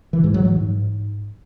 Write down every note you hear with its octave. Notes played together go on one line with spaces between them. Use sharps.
E3
G#2
F#3
E3
G#2